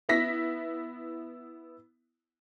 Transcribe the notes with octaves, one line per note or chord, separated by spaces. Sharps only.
B3 E4 A#6 B6